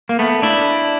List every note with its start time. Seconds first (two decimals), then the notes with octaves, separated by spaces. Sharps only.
0.09 A#3
0.19 A3 B3
0.42 D4 E4